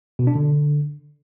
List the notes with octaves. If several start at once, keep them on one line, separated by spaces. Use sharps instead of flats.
B2
D4
D3